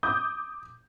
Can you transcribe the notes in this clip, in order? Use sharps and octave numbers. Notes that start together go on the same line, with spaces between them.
D6 D#6 G6